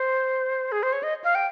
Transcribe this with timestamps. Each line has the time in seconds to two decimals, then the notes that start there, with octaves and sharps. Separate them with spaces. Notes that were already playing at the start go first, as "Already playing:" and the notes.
Already playing: C5
0.72 G#4
0.83 C5
0.93 C#5
1.03 D#5
1.24 F5
1.35 G5